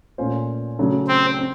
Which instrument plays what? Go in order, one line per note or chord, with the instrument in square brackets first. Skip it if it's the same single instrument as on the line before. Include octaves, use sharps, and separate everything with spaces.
[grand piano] A#2 A3 C#4 F4 C5
C#3 F#3 A3
[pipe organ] C4
[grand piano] C4